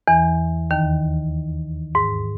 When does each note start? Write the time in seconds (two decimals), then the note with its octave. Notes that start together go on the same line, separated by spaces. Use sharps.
0.07 E2 E3
0.71 D#2 D#3
1.95 G#2